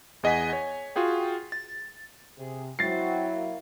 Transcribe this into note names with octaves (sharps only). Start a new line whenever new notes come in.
E2 G#4 D#5 F#5 G#5 B6
C#5 G#5
F4 F#4 G#4 G5
A6
C3 G#4
F#3 C4 E4 F#4 A6 C7
A#3